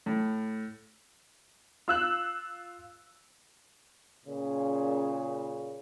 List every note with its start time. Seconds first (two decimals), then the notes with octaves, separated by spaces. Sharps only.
0.06 A2
1.88 F4 E6 F#6
4.26 A#2 C#3